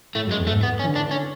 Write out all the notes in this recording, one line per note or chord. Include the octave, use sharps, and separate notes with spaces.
A2 A3
F#2 G#3
E2
A3
G#2
B3
C#4
E3
D3
D4
E3
D3 C#4